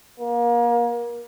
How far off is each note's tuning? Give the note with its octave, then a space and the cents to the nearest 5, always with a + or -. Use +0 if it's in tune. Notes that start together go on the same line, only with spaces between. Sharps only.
A#3 +30